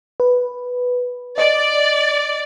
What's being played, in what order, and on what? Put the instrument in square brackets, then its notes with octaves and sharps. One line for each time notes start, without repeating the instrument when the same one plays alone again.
[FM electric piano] B4
[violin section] D5 [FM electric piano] D#5